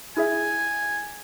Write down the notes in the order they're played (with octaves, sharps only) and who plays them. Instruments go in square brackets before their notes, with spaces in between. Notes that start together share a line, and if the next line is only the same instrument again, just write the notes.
[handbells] E4 G#4 E5 [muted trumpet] G#5